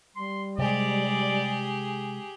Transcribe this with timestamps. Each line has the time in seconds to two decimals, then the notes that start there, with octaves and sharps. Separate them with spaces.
0.16 G3 C6
0.59 C3 G#3 G4 G#4 D5